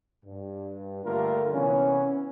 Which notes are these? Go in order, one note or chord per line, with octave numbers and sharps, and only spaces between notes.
G2
D3 G3 A3 A#3 F4 A#4
C3 E3 B3 C#4